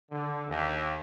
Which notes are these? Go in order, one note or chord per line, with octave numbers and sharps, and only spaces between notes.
D3
D#2